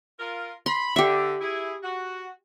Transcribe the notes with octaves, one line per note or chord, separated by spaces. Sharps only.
F4 A#4
B5 C6
D3 G4 E5
E4 G#4
F#4